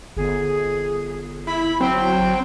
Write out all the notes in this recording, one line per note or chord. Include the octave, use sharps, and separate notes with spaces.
G1 G#4
E4 B5
F#3 C4 G5